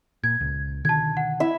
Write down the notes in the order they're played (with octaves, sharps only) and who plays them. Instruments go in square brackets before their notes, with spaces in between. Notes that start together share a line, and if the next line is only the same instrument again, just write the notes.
[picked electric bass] A#2 [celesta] G#6
[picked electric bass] C#2
[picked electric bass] B2 D3 D#3 [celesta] A5 G#6
[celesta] F#5
[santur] E4 E5